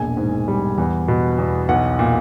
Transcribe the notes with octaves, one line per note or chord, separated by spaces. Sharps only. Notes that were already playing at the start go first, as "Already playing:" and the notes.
Already playing: E1 A#1 G#5
G#2
G3
E2
B2
E2
B1 F#5
A#2